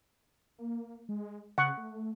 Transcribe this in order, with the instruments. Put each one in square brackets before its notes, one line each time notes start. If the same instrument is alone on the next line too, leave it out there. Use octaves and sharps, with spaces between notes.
[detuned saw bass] A#3
G#3
[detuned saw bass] C#3 [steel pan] F#5 C#6
[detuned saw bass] A3